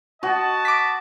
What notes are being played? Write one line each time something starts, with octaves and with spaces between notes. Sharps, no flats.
F#4 D#5 A5
D6 B6